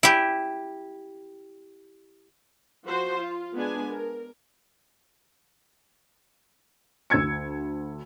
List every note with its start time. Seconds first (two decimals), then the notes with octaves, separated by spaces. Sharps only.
0.03 E4 G4
2.85 F3 F#4 C5
3.18 F4
3.54 G#3 B3 D4 G#4 G#5
3.91 A#4
7.10 D2 E6 G#6 C#7